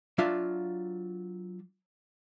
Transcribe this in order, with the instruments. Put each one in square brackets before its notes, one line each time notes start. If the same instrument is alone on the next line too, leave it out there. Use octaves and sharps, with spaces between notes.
[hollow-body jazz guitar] F#3 D4 F4 E5 F5